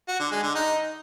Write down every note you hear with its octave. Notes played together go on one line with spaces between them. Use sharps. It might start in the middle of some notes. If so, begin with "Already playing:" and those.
F#4
D3
G#3
D3
D#4